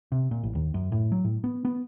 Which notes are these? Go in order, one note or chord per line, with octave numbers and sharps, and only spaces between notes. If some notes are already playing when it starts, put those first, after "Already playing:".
C3
A#2
A1
D#2
F#2
A2
F#3
A2
B3
B3